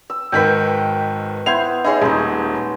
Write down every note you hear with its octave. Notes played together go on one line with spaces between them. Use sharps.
E6
G#1 D#3 B4 G5 B6
B3 E4 C5 G#6 C7 F7
D#4 E4 G#4 C#5
D#1 G#3 D#4